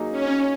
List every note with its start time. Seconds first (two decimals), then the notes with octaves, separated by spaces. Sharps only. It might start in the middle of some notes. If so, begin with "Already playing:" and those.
Already playing: F#3 A#3 D#4 G#4
0.11 C#4